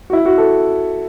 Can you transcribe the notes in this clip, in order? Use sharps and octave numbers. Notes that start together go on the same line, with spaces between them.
F#4
E4
F#4
A4